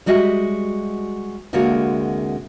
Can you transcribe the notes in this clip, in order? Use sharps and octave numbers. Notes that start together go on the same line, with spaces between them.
G3 G#3 F#4 D#5 E5
D2 C3 G#3 A#3 D4 F#4